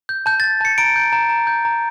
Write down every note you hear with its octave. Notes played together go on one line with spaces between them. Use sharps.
G6
A5 G6
A6
G6
A5 C#7
A#5 D7
G6
A#5
A#5
G6
A#5